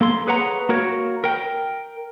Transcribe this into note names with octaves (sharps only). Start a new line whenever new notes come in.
A#3 A4 C6
G#4 B4 C#5 F#5 A#5
A#3 F#4 A#4 C#5
A#4 G5